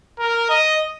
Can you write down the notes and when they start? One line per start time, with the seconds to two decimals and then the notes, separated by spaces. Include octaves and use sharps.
0.19 A#4
0.50 D#5